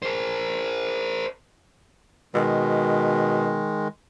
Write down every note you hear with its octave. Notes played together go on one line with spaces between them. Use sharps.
A#4 C5
B2 D#3 G#3